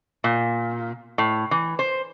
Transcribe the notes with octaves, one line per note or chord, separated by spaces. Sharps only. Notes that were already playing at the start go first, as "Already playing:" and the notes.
A#2
A2
E3
C5